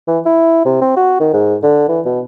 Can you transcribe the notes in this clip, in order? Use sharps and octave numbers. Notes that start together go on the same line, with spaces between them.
E3
E4
C3
C4
F#4
D#3
G#2
D3
E3
B2